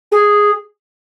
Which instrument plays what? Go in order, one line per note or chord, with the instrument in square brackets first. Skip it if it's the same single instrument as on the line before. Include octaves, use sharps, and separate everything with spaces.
[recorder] G#4